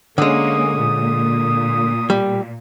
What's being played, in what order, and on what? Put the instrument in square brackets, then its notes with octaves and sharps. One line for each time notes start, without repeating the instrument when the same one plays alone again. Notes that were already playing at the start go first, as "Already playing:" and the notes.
[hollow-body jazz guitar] D3 G#3 [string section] A#3 C#4 [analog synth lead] D#6
[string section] A#2
[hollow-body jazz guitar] G3